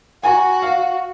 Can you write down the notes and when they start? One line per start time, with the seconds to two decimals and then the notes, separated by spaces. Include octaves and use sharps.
0.23 F#4 G#5 A#5
0.62 F5